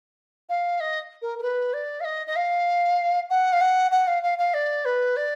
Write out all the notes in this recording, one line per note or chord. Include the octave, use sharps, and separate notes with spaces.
F5
D#5
A#4
A#4
B4
D5
F5
D#5
D#5
F5
F#5
F5
F#5
F#5
F5
F5
F5
D5
B4
D5